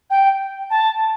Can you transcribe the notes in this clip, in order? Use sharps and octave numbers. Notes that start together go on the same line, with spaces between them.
G5
A5